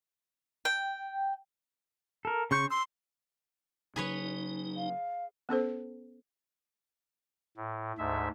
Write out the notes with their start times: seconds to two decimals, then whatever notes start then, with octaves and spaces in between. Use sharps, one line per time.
0.65 G5
2.25 A4 A#4
2.51 C#3 C6 C#6 G6
2.70 C6 E6
3.96 C#3 F#3 D#4 G#4 B4 C#5
4.76 F5
5.49 B3 C#4 A4 C5
7.57 A2
7.98 D2 G#2 E5